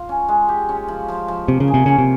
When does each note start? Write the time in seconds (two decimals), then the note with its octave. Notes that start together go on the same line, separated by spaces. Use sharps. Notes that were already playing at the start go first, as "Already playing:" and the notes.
Already playing: F4
0.09 C#4
0.28 G#3
0.49 G4
0.69 C#4
0.88 F3
1.08 F3
1.28 F3
1.48 C3 A#3
1.60 C#3
1.68 G#4
1.74 C3
1.86 C#3 C#4
1.99 C3